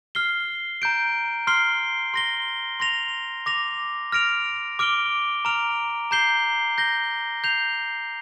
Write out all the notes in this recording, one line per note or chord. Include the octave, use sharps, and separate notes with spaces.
F6 C7 G7
A#5 G6 D7
C6 F6 C7 G7
C6 A#6 G7
C6 A#6 F7
D6 A#6 F7
F6 A#6 D7 F7
D6 F6 D7 G7
A#5 F6 D7 F7
A#5 G6 C7 G7
G6 A#6 G7
G6 C7 F7